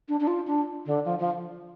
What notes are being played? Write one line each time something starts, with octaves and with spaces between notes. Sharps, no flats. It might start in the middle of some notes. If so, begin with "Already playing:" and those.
D4
D4
F4
D4
D3
F3
F3